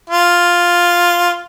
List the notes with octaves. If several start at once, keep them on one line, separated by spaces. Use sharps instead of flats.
F4